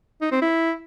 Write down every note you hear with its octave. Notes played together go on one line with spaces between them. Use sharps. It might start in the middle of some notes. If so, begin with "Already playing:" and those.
D#4
C4
E4